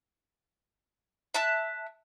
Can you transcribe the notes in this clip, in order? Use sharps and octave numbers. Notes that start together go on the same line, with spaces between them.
E5 A5 F#6